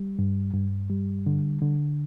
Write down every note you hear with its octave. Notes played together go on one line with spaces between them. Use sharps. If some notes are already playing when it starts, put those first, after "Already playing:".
Already playing: G3
G2
G2
G3
D3
D3